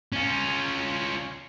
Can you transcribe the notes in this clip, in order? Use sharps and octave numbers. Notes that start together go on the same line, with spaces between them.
C#4 F4